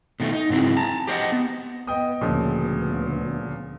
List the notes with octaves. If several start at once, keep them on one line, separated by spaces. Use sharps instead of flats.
B2 D#3 A3
D#4
G#2 C#3 F#3 C4 E4
A5 A#5
G4 C5 C#5 D#5 F#5
B3
B3 D#5 G5 D#6
D2 A#2 C#3 F3 B3